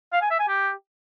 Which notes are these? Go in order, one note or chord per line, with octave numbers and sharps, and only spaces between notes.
F5
G#5
E5
G#5
G4